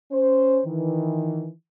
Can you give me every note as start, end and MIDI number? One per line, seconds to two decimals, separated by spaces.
0.11 0.61 61
0.11 0.61 72
0.66 1.49 51
0.66 1.49 52